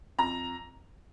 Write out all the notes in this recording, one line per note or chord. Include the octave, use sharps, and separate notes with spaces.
F2 A#5